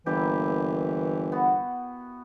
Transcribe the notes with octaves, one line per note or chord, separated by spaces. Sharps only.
G1 A#2 E3 E4 G4
B3 F#4